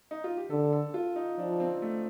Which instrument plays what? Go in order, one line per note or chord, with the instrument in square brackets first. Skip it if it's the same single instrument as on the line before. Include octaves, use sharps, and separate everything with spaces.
[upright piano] D#4
F4
G4
[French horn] D3 [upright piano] A4
[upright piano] A4
F4
D#4
[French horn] F3 [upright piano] D4
[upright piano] C4
A3